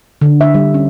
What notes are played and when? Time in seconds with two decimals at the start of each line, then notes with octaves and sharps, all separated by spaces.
0.21 D3
0.41 E5
0.54 G3
0.74 C#4